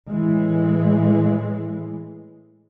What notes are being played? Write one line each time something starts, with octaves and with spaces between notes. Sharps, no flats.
A2 E3 G#3